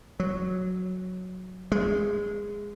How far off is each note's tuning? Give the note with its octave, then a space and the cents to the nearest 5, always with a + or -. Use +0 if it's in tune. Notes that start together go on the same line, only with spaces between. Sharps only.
F#3 -5
G#3 -15